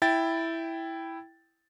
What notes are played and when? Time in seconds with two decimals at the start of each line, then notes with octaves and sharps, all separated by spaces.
0.02 E4 G5 A6